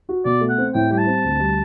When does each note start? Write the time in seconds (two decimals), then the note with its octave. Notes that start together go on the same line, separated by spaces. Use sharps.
0.09 F#4
0.25 B2 D5
0.41 A3
0.49 F#5
0.58 C4
0.74 A2 G5
0.90 G3 G5
0.98 A5
1.06 C4
1.24 D2
1.40 G3